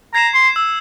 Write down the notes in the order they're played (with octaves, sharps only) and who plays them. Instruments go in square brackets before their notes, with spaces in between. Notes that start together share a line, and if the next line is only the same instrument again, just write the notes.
[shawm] A#5 [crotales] G#6 C7 E7
[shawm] C6
[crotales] E6